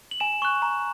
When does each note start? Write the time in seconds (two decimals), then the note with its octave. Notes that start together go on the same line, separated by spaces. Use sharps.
0.11 F#7
0.20 G#5 E7
0.42 C#6 F#6
0.62 A#5